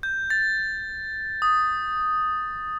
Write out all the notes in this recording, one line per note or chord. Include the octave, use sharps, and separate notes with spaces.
G6
A6
D#6